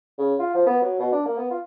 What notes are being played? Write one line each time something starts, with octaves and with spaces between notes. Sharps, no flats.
C#3
F4
F3
B3
F#3
B2
D4
A#3
B3
F4